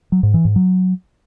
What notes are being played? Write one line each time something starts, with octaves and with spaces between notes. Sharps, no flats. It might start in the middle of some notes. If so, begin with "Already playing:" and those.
F#3
G#2
E3
G#2
F#3